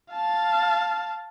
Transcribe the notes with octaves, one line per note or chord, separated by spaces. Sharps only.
F5 A5